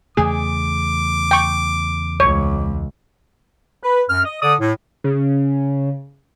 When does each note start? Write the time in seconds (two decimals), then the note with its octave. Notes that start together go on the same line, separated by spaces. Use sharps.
0.17 E2 C#3 A3 G#4 D6
1.31 G5 C#6
2.20 C#2 C#5
3.83 B4
4.10 F#2 F6
4.25 D#5
4.42 D3 D5 D#6
4.60 A2
5.04 C#3